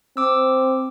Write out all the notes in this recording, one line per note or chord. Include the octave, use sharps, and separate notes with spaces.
C4 D6 E6